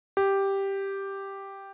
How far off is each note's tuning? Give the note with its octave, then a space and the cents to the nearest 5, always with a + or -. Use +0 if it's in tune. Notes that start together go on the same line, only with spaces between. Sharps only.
G4 +0